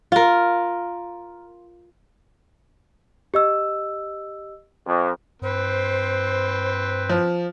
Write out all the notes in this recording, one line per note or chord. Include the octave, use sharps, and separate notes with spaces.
F4 A#4
G4 D#5 E6
F2
G2 C4 B4 C5
F3